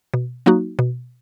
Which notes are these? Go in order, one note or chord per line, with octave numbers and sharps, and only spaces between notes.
B2
F#3 A#3 D#4 F#4
B2